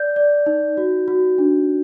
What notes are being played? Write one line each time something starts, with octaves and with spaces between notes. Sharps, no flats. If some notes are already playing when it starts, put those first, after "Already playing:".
Already playing: D5 G6
D5
D#4
F#4
F#4
D4